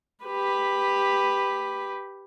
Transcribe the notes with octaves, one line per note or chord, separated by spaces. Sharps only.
G4 B4